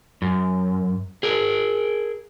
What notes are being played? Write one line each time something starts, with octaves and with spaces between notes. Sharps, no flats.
F#2
G#4 A#4